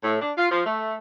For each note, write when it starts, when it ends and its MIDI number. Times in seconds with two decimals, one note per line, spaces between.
0.04 0.19 45
0.21 0.32 62
0.37 0.50 65
0.51 0.61 53
0.66 0.95 57